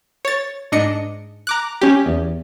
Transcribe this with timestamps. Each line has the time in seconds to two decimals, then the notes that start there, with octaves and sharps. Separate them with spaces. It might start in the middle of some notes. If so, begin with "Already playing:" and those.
0.25 C#5 A6
0.72 G#2 D4 D#5 C#7
1.47 A#5 D6 F#6
1.81 C#4 G4
2.06 E2